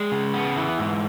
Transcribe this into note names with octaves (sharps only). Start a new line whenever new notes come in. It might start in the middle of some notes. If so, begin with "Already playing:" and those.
Already playing: G#3 D5
C#3
B3
E3
G#2